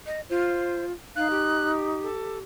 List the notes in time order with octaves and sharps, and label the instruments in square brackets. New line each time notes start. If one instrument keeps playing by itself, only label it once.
[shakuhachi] D#5
[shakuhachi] F4 [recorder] C5
[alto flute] D#4 [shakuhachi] F5 [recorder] F#6
[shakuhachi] G4
[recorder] A4